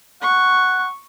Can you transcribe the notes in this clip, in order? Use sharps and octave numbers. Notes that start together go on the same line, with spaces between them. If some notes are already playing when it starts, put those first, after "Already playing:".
F#5 C#6